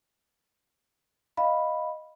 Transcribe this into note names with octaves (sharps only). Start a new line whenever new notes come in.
D#5 F5 B5